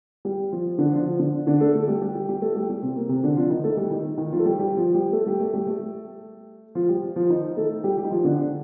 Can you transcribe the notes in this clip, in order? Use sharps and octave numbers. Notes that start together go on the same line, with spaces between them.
G3 G4
F3 F4
D3 D4
F3 F4
F3 F4
D3 D4
D3 D4
A3 A4
A3 A4
G3 G4
G3 G4
G3 G4
G3 G4
A3 A4
G3 G4
G3 G4
C3 C4
A#3
C3 C4
D3 D4
F3 F4
D#3 D#4
A3 A4
G3 G4
D#3 D#4
D#3 D#4
F3 F4
A4
G3 G4
G3 G4
F3 F4
G3 G4
A3 A4
G3 G4
A3 A4
G3 G4
A3 A4
F3 F4
G3 G4
F3 F4
D#3 D#4
A3 A4
G3 G4
G3 G4
D#4
F3 F4
D3 D4